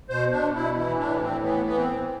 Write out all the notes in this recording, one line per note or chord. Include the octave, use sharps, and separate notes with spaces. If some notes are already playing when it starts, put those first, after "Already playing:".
B2 C5
B2 D4
B2 E4
E3 E4
A2 D4
B3
A2 C4
E3 B3
E3 B3
C4
E3